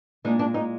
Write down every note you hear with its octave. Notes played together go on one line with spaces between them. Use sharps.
A#2 G#3 D4 D#4
D4
D#4